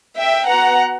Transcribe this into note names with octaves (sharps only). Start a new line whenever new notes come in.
E5 G5
B3 F#4 F#5 A#5